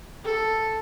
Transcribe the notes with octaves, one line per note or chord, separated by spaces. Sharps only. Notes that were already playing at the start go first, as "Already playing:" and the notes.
A4